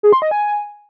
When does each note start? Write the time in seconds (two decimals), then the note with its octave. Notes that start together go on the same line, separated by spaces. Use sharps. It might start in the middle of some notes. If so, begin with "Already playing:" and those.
0.03 G#4
0.13 C6
0.22 D#5
0.31 G#5